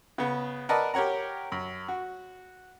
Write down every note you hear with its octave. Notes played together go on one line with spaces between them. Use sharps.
C#3 B3
A#4 B4 D5 D#5 F#5 A5
G4 A#4 C#5 F#5 A#5
F#2
F#4